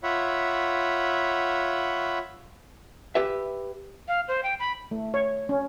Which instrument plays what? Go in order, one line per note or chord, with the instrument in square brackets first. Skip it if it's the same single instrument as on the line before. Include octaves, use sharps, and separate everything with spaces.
[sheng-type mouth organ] F4 C#5 E5 F#5 B5
[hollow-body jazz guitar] G4 B4 E5
[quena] F5
C5
G5
B5
[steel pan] A3
C#5
C#4